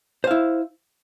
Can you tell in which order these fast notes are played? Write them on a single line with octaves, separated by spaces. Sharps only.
C5 F5 E4